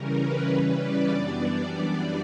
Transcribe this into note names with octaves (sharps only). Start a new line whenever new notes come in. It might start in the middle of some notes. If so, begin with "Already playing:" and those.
Already playing: C#3 E3 G3 C#4 A#4
B4
C#3 E3 G3 C#4
D5
F#2 E3 G3 B3 D4